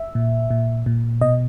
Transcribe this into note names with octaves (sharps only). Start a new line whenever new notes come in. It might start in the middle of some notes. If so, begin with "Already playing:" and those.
Already playing: E5
A#2
A#2
A#2
B2 D#5